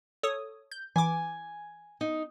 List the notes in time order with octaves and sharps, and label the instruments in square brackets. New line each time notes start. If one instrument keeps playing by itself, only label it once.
[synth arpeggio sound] A4 C#5 D#6
G6
[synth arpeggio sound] E3 D6 [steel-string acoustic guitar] G#5
[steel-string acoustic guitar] D#4